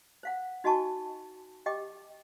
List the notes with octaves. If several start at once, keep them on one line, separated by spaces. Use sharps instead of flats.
C5 F5 F#5
D#4 F#4 D#5 G#5 A5 C#6
G4 D#5 G5 D6